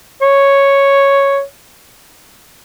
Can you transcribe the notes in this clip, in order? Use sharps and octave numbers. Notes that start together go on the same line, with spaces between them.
C#5